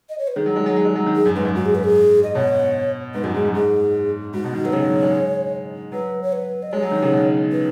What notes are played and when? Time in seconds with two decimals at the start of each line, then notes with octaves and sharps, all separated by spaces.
0.09 D#5
0.18 C#5
0.28 B4
0.36 D#3 G#4
0.46 F#3
0.56 G#3
0.66 F#3
0.76 F#3
0.85 G#3
0.96 F#3
1.06 D#3
1.15 G#4
1.26 F#2
1.35 G#2 B4
1.45 F#2
1.55 G#2 F#4
1.66 G#4
1.75 B4
1.85 G#4
2.23 D#5
2.35 B2 C#5
3.14 G#2 B4
3.24 F#2 F#4
3.34 G#2 G#4
3.45 F#2
3.54 G#2 G#4
4.34 G#2 F#4
4.44 B2
4.53 D#3
4.64 F#3 B4
4.73 C#3 C#5
4.83 F#3
5.03 G#3
5.92 F#3 B4
6.23 C#5
6.32 B4
6.63 D#5
6.72 G#3 C#5
6.82 F#3
6.91 D#3
7.02 C#3
7.12 B2
7.52 B4